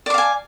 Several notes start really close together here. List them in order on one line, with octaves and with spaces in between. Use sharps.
D5 D6 F5 G#5